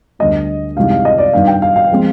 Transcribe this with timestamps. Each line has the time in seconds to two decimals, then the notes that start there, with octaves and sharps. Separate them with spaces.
0.19 D2 D3 G3 B3 D#5
0.77 C2 C3 D#3 G#3 F5
0.91 F5
1.05 D#5
1.18 D5
1.33 G2 D#3 B3 F5
1.47 G5
1.62 F5
1.76 F5
1.91 F3 G#3 C4